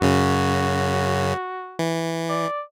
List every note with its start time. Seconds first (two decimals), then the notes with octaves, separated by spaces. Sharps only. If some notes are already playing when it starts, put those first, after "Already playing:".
0.01 F#2 C#3 F#4
1.79 E3
2.29 D5